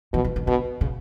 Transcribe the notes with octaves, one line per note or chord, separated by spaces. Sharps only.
B2 E3
E3
D#3
B2 D3
C#3